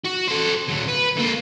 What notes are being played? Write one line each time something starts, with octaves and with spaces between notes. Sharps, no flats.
F#4
A4 C5
D2 F#3
B4
D3 A#3